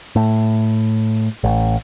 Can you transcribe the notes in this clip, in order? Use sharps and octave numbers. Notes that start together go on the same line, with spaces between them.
A2
A1